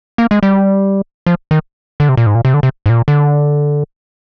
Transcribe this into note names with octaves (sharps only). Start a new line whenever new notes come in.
A#3
G#3
G3
F3
D#3
D3
C3
A#2
G#2
A#2
C3
D3
C3
G#2
A#2
D3